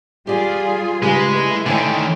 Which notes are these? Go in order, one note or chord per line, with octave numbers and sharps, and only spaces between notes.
G3 F4 G4 G#4 D5 G#5
G#2 C#3 G3 G#3 F4 B4 G#5
A3 E4
D3 D#3 C#5 G5 G#5